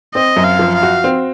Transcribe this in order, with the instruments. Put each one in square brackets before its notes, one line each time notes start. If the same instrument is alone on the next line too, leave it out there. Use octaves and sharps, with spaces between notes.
[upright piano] C4 [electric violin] D#5
[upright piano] F#2
[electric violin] F5
[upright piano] F3
[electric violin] F5
[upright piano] F#4
C4